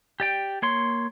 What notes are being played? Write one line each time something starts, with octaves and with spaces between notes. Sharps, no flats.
G4 D5 G5
A#3 C#5 C6